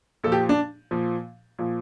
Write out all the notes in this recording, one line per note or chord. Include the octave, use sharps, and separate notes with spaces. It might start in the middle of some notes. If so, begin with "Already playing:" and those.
A#2 F3 A4
G4
D4
A#2 F3
A#2 F3